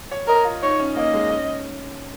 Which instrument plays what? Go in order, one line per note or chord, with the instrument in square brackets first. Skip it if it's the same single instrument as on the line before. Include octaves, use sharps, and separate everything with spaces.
[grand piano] C#5
[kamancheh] A#4 [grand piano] D#5
[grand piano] F4
[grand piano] D#4 [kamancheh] C#5
[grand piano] C#4
[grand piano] A#3 [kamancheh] D#5
[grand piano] G#3
C#4